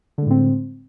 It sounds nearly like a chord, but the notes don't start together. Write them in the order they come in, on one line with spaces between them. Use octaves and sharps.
D3 G#3 A2 C4